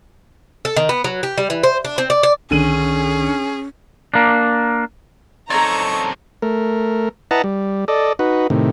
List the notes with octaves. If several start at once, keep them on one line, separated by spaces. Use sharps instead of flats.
A4
D#3
B3
F#3
G4
G3
E3
C5
D4
C4
D5
D5
C2 D3 D#3 C#4 G#4 D#7 F#7
A#3 D4
F#2 C4 D#4 A4 C#5 D5 A#5 C#6
A3 A#4
E4 B4 D#5 F#5 A5 A#5
G3
A4 D5 D#5
D#4 F#4 B4
A2 C3 D#3